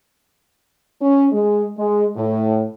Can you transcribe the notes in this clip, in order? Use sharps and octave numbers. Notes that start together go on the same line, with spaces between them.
C#4
G#3
G#3
A2